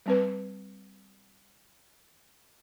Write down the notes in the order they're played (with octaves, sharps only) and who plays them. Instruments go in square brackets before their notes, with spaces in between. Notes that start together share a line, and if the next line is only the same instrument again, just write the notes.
[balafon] G3 C4 B4